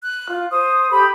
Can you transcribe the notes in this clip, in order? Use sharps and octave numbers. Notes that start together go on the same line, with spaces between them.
F#6
F4
C5 D#6
G4 A4 B5